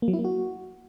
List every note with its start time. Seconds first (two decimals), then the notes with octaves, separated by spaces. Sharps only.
0.02 A#3
0.08 F#3
0.13 E4
0.19 A#3
0.24 F#4